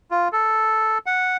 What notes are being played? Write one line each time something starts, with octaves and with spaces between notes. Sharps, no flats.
F4
A4
F#5